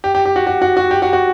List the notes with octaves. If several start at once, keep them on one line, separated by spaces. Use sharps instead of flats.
G4
G4
G4
F#4
F#4
F#4
F#4
G4
F#4
F#4